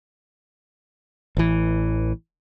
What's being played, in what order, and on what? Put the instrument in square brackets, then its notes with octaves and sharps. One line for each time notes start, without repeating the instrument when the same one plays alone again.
[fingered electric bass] A1 E3